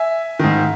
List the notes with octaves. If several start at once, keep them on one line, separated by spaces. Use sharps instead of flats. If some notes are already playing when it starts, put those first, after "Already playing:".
Already playing: E5 G#5
G#2 D#3